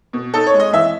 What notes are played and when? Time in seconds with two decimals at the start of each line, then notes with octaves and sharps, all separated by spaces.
0.13 B2
0.34 D#4 A4
0.47 C#5
0.54 G#3
0.60 D#5
0.73 E3 E5